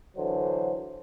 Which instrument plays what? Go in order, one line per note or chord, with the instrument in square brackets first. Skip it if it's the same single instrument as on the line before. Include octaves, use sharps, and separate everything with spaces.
[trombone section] D3 E3 F#3 C5